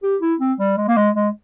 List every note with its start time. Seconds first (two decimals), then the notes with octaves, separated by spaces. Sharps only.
0.03 G4
0.21 E4
0.40 C4
0.60 G3
0.77 G#3
0.88 A#3
0.97 G#3
1.15 G#3